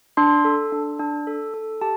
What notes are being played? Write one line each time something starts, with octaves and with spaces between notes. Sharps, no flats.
D4 C6
A4
D4
D4
A4
A4
G4 A5